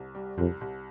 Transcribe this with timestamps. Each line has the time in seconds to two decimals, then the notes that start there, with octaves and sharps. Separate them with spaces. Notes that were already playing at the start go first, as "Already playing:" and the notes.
Already playing: C2
0.15 G3
0.38 C2 F2
0.61 C2